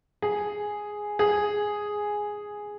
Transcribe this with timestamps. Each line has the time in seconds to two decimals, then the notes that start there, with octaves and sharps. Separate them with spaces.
0.22 G#4
1.19 G#4